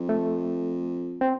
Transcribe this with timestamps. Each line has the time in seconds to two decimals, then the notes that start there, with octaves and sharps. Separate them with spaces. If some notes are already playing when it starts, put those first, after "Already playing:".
Already playing: F2
0.09 A3
1.21 C4